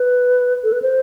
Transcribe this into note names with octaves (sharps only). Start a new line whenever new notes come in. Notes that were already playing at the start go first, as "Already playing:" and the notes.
Already playing: B4
A4
B4
C5